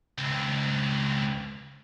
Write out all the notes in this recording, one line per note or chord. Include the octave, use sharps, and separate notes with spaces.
C#2 C4